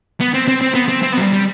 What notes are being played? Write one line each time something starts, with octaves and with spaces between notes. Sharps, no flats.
B3
C4
C4
C4
B3
C4
C4
B3
F#3
G3
G3